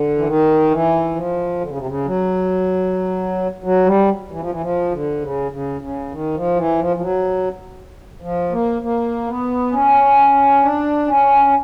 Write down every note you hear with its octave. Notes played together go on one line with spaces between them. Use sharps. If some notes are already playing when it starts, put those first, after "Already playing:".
Already playing: D3
E3
D#3
E3
F3
D3
C#3
C3
C#3
F#3
F#3
G3
E3
F3
E3
F3
D3
C#3
C#3
C#3
D#3
F3
E3
F3
F3
F#3
F3
A#3
A#3
B3
C#4
D4
C#4